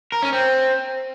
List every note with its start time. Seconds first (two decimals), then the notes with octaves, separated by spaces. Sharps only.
0.12 A#4
0.23 C#4
0.33 C4